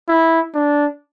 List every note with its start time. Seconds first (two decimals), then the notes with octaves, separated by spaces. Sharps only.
0.08 E4
0.54 D4